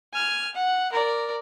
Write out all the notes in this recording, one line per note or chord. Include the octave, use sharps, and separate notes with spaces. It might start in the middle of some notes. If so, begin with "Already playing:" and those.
G#5 F6
F#5
A#4 D5